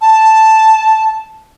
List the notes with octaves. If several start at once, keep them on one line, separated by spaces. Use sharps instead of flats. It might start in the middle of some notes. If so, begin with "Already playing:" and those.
A5